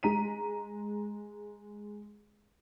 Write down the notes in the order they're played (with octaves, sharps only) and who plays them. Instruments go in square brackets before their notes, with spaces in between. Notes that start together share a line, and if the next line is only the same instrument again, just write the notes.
[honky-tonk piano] G#3 A#5 B6 D#7